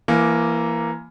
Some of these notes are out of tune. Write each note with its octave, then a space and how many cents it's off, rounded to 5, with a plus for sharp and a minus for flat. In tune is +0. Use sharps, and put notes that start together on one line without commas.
E3 +25 A#3 +0